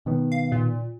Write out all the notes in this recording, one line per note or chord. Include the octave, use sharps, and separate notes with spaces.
B2 D#3 B3
F5
A#2